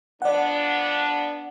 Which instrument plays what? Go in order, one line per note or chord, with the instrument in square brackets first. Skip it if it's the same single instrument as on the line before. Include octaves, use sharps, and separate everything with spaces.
[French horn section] F3 B3 D4 [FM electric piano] D5 F#5